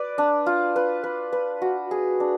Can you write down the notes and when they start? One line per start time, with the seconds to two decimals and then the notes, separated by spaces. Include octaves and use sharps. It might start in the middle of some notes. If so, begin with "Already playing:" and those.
Already playing: B4 D5
0.18 D4
0.46 F4
0.76 B4
1.04 B4
1.33 B4
1.62 F#4
1.91 G#4
2.20 D4